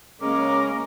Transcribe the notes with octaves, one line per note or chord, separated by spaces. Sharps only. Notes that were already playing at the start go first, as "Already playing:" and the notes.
C#3 G#3 A#3 C#4 A#4 D6